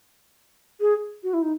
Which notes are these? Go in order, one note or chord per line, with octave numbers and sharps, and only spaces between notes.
G#4
F#4
E4
D#4